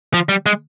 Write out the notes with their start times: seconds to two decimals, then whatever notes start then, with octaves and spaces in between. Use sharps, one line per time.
0.14 F3
0.29 G3
0.46 G#3